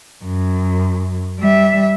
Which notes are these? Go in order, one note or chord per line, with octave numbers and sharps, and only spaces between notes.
F#2
G3 E5